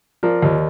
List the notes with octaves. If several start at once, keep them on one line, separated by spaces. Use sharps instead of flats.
F3 A#4 D5
D#2